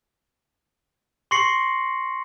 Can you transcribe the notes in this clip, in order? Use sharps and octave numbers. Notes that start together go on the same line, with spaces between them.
C6 C#6 A#6 C7 C#7 F#7